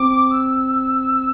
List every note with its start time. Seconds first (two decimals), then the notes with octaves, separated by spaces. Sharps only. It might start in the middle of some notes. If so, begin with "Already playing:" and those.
Already playing: C4 D6
0.31 E6